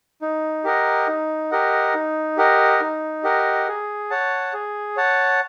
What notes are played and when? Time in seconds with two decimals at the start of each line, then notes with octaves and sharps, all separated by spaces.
0.22 D#4
0.64 G4 A#4 D#5 F#5
1.07 D#4
1.51 G4 A#4 D#5 F#5
1.94 D#4
2.37 G4 A#4 D#5 F#5
2.81 D#4
3.24 G4 A#4 D#5 F#5
3.68 G#4
4.10 C#5 F#5 A5
4.53 G#4
4.97 C#5 F#5 A5